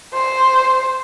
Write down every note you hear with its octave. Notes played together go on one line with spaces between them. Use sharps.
C5